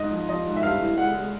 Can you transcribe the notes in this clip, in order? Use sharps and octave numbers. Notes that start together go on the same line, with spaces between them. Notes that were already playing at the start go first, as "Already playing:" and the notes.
Already playing: G#2 D#5
F3
F3 D#5
G#2
E5
G2 F5
E3
G#3 F#5
G#3